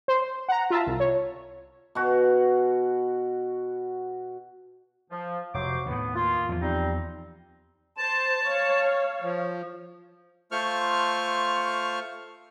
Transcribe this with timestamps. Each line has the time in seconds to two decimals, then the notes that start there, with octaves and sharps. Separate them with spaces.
0.08 C5
0.48 F#5 A#5
0.70 F4 E5 A5 A#5
0.87 C2
1.00 C#5
1.95 B2 F#4
5.11 F3
5.54 F1 F#3 C5 D6
5.86 D#2 A2 B3
6.15 A#3 F4
6.49 E2 F3
6.61 G3 C4 D#4
7.97 C5 A5
8.44 C#5 F5
9.22 F3
10.52 A3 F4 C5 C#6 F6